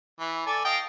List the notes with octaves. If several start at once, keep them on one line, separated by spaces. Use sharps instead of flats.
E3
A4 D5 G#5
D#5 F5 G5